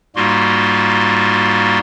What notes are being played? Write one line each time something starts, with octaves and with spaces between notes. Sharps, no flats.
G#2 G3 A#3 F4 F#4 C6